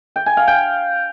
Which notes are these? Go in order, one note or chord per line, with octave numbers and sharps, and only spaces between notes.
G5
G#5
F5
G5